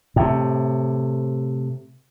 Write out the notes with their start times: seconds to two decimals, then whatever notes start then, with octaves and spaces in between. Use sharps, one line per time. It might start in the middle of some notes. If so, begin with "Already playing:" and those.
0.16 A2 C3